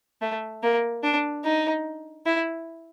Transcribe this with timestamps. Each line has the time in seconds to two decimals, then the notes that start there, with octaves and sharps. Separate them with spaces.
0.22 A3
0.63 A#3
1.03 D4
1.44 D#4
2.26 E4